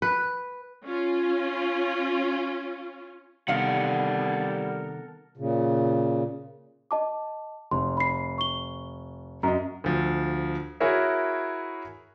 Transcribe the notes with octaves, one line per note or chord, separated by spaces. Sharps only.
B4
C#4 F4
C3 D#3 G3 B3 A4 A#4 F5 F#5
A#2 C#3
D#5 A5 D6
F1 C6
B5 C7
C#6 G7
F#2 D#5 A#5
D2 F3
E4 F#4 G#4 A#4 C#5 E5